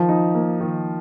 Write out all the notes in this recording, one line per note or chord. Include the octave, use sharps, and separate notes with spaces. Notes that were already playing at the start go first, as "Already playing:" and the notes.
Already playing: D#3 F3
D#4
A#3
D#3